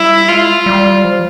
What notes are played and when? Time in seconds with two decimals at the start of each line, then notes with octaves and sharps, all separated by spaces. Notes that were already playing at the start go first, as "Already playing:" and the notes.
Already playing: G3 E4
0.28 G#3 F4
0.66 G3
1.04 F3